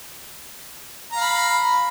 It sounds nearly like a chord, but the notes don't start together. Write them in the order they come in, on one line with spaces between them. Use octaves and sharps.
A#5 F5 B5